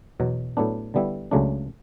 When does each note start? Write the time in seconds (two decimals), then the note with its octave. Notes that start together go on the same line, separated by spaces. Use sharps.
0.20 E2 B2 F#3
0.57 A2 F#3 B3 D4
0.94 D3 G3 B3 E4
1.31 C#2 C#3 F#3 A3 D4